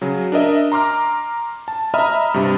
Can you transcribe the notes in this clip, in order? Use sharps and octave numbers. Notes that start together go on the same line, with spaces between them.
C#3 F#3
D4 A#4 D#5 E5
A#5 C6 D6 F6
A5
D#5 E5 A#5 B5 D#6 F6
G2 C3